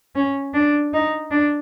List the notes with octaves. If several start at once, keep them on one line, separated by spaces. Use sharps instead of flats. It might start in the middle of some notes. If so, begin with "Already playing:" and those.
C#4
D4
D#4
D4